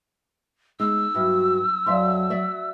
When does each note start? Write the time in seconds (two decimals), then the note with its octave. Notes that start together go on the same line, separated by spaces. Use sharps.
0.80 G#3 B3 D#4 E6
1.15 G2 F#3 F#4 E5 F6
1.86 F2 F#3 D5 E5 F5 C6
2.30 F3 F#4 D5 E5